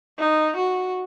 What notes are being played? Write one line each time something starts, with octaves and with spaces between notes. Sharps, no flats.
D#4
F#4